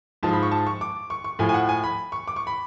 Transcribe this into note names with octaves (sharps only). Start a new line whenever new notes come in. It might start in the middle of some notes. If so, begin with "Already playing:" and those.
G#2 F3 A5
B5
C#6
A5
C#6
D6
C#6
C#6
A2 F3 G#5
G#5
F#5
G#5
B5
C#6
D6
C#6
B5